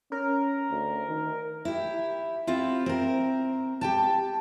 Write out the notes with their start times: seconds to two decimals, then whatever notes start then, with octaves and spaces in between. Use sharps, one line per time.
0.12 C#4 A#4
0.70 D2
1.08 D#3
1.65 E4 G4
2.47 C4 E4 F4 G4
2.86 C4 A#4
3.81 G4 G5 A5